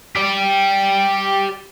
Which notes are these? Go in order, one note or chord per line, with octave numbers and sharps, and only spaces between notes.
G4 D5